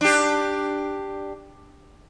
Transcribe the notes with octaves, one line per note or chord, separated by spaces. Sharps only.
D4 G4